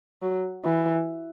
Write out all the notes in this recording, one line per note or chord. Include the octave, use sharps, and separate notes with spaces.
F#3
E3